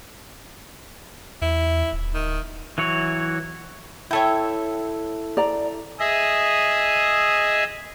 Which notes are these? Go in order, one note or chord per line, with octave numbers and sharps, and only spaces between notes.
E2 E4
D1
D#3
E3 F#3 C#5
E4 A4 C#5 E5 G5
D5 A#5
G#4 D#5 E5